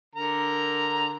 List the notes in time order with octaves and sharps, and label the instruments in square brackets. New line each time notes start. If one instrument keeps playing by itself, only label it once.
[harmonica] D3 A#4 A#5